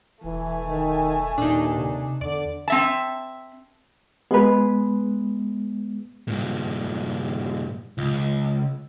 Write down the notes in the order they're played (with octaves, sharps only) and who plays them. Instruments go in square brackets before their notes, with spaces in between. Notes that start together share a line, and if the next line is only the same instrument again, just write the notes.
[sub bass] E1 [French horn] E3 [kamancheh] A3 G#5
[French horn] D#3
[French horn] D#2 [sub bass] A#2 [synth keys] D4 D#4
[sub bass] C3
[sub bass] E2 [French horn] D3 [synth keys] D5 D6
[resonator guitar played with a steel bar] C4 E5 A5
[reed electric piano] G#3 B3 [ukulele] G#4 B4
[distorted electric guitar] G2 A#2
C#2